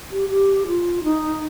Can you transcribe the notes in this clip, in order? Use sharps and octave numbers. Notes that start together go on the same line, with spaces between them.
G4
G4
F4
D#4